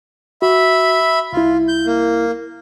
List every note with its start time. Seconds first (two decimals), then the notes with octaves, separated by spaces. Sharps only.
0.42 F#4 E5 B5
1.33 C2 E4 F4
1.68 G6
1.86 A#3